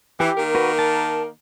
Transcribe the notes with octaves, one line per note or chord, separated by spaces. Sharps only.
E3 G4
D#3 A#3 A#4
F#4 B4
A5